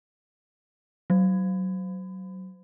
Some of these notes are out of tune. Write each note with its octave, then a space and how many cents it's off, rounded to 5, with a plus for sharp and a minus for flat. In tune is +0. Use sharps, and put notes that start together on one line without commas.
F#3 +20